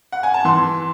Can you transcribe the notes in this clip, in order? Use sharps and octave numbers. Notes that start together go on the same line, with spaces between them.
F#5
G#5
A5
E3 C6